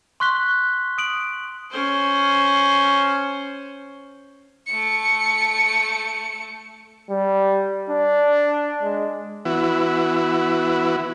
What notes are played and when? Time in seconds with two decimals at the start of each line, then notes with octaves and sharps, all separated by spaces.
0.20 C6 C#6 F#6 B6 G7
0.98 D#6 D7 F#7
1.71 C#4 C5
4.67 A3 C#7
7.10 G3
7.90 D4
8.83 G#3
9.45 E3 B3 E4 F#4